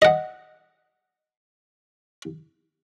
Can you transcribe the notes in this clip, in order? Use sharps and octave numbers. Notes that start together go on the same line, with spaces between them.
D#5 F#5